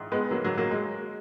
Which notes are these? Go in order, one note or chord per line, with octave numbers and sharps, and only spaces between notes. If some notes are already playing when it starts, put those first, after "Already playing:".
Already playing: A#1 G#2 E3
G#3 B3
F#3 A#3
F#3 A#3
F#3 A#3
G#3